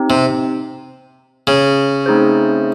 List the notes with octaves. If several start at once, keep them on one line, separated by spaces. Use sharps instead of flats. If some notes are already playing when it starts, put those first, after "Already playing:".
Already playing: C4 D#4 G4
C3
C#3
A3 C4 D#4 G#4 C5